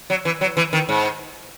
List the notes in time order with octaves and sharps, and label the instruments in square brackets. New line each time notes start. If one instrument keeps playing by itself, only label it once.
[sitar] F#3
E3
F#3
E3
D#3
G#2